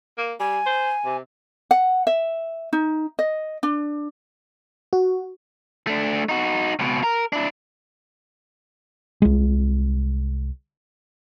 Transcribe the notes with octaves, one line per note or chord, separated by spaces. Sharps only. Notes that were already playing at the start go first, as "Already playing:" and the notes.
A#3
G3 G#5
C5
C3
F#5
E5
D#4
D#5
D4
F#4
A3 D4
D#4 F#4
C#2 B2
A#4
D4 E4
C2 G#3